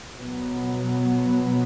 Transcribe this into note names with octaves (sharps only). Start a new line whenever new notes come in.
B2 F#3 B3